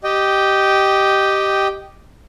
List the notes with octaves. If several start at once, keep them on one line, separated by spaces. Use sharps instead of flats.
G4 D#5 G5